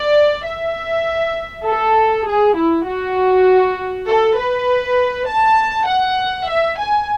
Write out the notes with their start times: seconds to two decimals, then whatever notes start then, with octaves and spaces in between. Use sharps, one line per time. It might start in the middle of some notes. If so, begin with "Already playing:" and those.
Already playing: D5
0.45 E5
1.65 A4
2.27 G#4
2.56 E4
2.87 F#4
4.07 A4
4.37 B4
5.27 A5
5.88 F#5
6.49 E5
6.79 G#5